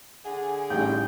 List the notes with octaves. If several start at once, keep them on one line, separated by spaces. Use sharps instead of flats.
D3 G#4 F#5
A1 G3 D#4 E4 G5